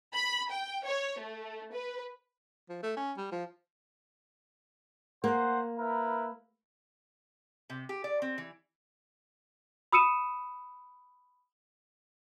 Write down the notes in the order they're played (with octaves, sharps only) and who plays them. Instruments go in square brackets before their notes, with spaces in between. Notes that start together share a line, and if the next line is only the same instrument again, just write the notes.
[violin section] B5
G5
C#5
A3
B4
[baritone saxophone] F3
A3
C#4
G3
F3
[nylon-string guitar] A#3 [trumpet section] C5 F#5
[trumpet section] E4 A#4 B4
[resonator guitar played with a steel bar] C3
G4
D5
C4
E3
[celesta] B5 D#6 E6 C#7 D#7 E7